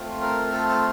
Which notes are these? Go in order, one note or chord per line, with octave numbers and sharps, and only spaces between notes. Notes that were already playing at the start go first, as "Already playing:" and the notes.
Already playing: A3 C4 F4
A#4
A4
A4